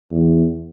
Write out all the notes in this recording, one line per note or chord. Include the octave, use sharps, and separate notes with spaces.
E2